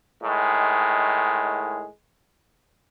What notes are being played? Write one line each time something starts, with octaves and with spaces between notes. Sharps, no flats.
A2 D#3 G#3